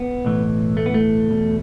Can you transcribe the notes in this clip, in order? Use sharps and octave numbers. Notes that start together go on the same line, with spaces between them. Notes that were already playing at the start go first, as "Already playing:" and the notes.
Already playing: B3
B1 A2 E3
A3
B3
A3
E2 B2